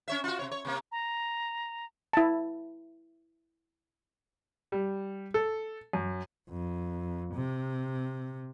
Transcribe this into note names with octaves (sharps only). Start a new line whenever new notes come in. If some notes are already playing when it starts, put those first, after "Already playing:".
C#4 C#5 E5
F4 F#4
C3 C#5
C#5
C3 A#3
A#5
E4 A5
G3
A4
F#2
F2
C3